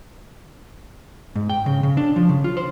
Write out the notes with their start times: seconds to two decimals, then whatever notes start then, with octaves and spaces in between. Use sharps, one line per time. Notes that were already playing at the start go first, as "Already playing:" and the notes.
1.35 G#2
1.49 G5
1.66 C#3
1.83 C#3
1.97 D4
2.16 F3
2.29 C#3
2.44 F4
2.57 C5